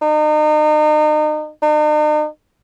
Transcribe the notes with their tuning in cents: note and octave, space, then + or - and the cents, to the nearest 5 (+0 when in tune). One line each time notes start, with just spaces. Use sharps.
D#4 -35
D#4 -45